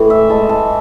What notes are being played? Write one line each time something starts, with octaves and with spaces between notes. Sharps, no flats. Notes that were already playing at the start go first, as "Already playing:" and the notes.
Already playing: A2 E3
E5
E3 G#3 A5
A5